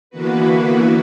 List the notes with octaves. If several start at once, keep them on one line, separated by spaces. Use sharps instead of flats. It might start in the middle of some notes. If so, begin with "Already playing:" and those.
D3 E3 A#3 B3 F#4 B4